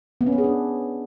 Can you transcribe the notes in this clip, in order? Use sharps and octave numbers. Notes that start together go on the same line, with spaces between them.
B3
C#4
B3
G#4
D4